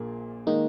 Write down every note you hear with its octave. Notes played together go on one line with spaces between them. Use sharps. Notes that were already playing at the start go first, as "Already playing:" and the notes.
Already playing: A#1 A#2 A#3 G#4
D#3 G#3 A#3 D#4